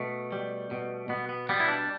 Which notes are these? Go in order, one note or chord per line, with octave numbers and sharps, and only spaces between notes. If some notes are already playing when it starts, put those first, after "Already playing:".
Already playing: B2 A3
G3
B2
B2 B3
B3
G3 B3
E4
D4